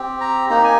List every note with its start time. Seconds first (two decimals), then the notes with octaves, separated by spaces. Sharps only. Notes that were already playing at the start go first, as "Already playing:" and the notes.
Already playing: C4 G4
0.21 A#5
0.49 A#3 D#4 G4 A#5
0.64 G#5